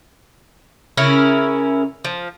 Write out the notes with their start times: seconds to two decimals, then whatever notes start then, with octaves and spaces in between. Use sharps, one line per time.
0.97 C#3 C#4 E4 A#4
2.04 F3